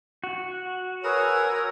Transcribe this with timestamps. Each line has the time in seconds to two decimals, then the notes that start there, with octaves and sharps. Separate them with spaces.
0.24 F#4
1.04 G#4 A#4 B4 C#5 G#5 E6